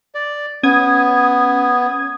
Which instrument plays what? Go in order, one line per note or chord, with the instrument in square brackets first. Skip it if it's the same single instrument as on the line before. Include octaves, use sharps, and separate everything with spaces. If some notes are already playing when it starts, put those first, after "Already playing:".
[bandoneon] D5
[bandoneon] B3 [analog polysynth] C#4 D#6 G#6